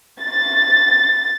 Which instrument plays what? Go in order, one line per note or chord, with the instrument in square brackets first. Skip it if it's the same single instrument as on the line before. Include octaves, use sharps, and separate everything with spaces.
[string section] A6